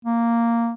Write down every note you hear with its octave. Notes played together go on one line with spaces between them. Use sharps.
A#3